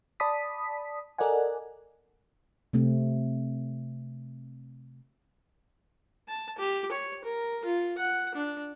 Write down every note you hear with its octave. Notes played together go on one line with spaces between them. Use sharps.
D5 A5 B5 D#6 B6
A4 A#4 D5 D#5 F#5 G#5
C3 A3 C4
A5
G4
C#5
A#4
F4
F#5
D4